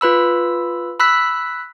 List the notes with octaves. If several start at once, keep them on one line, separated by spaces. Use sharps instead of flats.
F4 B4 B5 E6
B5 E6 F#6 B6